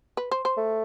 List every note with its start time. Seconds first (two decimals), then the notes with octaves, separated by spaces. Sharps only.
0.17 B4
0.31 C5
0.45 C5
0.57 A3